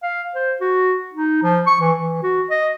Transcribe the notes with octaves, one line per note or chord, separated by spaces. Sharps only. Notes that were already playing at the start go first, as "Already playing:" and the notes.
F5
C5
F#4
D#4
F3
C#6
E3
E3
F#4
D#5